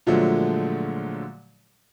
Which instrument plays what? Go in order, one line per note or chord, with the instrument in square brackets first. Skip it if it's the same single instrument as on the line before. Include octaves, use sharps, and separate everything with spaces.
[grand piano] A#2 D3 F3 F#3 G#3 A3